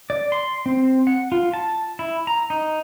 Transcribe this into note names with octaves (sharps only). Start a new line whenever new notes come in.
D5
C6
C4
F#5
F4
A5
E4
A#5
D#4